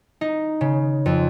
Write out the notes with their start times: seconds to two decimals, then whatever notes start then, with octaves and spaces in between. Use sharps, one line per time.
0.21 D#4
0.61 C#3
1.06 F2